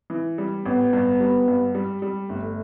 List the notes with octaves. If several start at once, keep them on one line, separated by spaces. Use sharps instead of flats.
E3
G3
A1 B3
G2
G3
G2
G3
G3
G1 A3